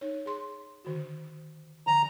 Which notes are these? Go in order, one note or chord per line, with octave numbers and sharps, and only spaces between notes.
D#4 C#5
G#4 C6
D3 D#3 F#4
D3 F3 G#5 A#5